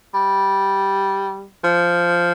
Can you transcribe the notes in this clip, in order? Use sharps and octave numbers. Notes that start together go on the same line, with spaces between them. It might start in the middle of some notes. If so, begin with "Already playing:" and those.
G3
F3